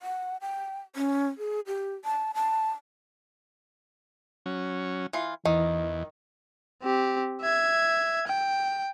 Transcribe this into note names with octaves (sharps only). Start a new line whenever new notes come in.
F#5
G5
C#4
G#4
G4
A5
A5
F#3 C#4
E3 F4
E2 D#3 E3 D#5
C4 G4
E5 G#6
G5